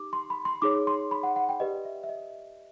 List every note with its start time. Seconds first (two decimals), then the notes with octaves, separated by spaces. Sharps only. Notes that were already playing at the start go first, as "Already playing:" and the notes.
Already playing: D#4 G4 D6
0.13 C6
0.30 B5
0.45 C6
0.62 D#4 G#4 C#5 D6
0.87 C6
1.11 B5
1.23 F#5
1.36 F#5
1.49 G5
1.60 G4 B4 D5 D#5
1.85 E5
2.03 E5
2.09 D#5